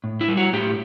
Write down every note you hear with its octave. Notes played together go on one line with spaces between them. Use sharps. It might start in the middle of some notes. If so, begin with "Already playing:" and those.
A2
E4
G3
F#4
A2 G4